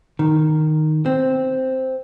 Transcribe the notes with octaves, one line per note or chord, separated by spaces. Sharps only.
D#3
C4